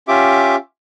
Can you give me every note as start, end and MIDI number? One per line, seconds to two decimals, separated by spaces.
0.08 0.56 61
0.08 0.56 65
0.08 0.56 67
0.08 0.56 76
0.08 0.56 86